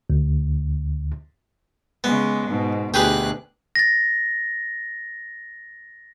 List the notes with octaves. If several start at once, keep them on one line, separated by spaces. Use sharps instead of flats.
D2
C#3 G#3 B3
G#2 B2
D2 B2 G4 G#4 B4 F#6
A6 A#6